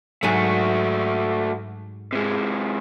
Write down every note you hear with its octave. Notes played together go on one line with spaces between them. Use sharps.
G#2 F#3 A3 F#4 G#5
C3 G#3